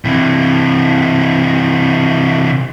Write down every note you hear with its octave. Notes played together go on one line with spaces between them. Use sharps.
C3 E3